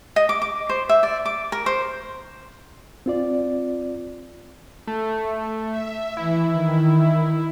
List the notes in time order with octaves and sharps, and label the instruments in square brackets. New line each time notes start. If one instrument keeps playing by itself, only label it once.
[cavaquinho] D#5
D6
D6
C5
E5
D5
D6
A#4
C5
[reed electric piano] C4 F4 D5
[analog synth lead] A3
[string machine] E5
[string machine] E3 [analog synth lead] E4
[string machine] D#3